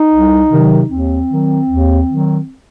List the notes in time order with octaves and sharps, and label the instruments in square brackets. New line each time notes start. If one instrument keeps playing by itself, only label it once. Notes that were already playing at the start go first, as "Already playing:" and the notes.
Already playing: [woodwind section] D#4
C2
C3 D#3 F#3
D#2 C4
D#3 F#3
D#2
D#3 F#3